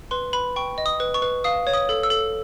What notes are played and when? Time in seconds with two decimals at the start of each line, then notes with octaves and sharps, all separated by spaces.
0.11 B4 C6
0.33 B4 B5
0.56 G5 C#6
0.78 D#5
0.86 D#6
1.00 B4
1.14 C#6
1.22 B4
1.44 F5 D#6
1.67 C#5
1.74 D#6
1.89 A4
2.03 E6
2.10 A4